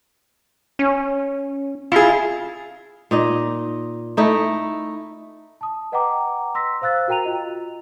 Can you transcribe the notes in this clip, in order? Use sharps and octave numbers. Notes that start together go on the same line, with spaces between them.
C#4
E4 F4 G#4
A#2 D#4 D#5
A3 D#4 E4
A5 D#6
B4 D#5 F#5 G5 A#5 D6
C6 E6 A#6 B6
C5 F5 E6 F#6 A6
F#4 A#4 G5 A#5 D#7 F7
F4 D#5